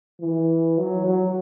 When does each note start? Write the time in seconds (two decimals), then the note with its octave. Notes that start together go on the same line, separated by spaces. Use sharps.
0.20 E3
0.78 F#3
1.06 F#3